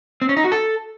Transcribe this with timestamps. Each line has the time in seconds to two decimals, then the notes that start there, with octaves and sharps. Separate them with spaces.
0.22 C4
0.29 C#4
0.37 D#4
0.44 F#4
0.52 A4